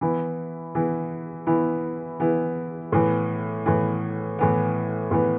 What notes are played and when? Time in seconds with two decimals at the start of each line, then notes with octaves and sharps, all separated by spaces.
0.01 E3 B3 E4
0.75 E3 B3 E4
1.47 E3 B3 E4
2.20 E3 B3 E4
2.92 A2 E3 B3
3.66 A2 E3 B3
4.39 A2 E3 B3
5.11 A2 E3 B3